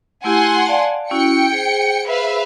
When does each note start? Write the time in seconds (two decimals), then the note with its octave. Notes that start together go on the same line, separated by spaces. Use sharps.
0.24 A3 E4 G4 F#5 G#5 C6
0.66 D5 F5 A5
1.11 C#4 E4 F#4 G5 C#7
1.52 G#4 C5
2.08 B4 E5 F5